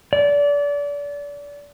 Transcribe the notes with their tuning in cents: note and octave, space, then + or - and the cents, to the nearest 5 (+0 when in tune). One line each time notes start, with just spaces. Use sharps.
D5 -30